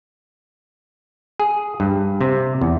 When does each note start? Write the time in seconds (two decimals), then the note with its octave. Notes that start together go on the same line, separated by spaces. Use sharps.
1.40 G#4
1.80 G2
2.21 C3
2.61 E2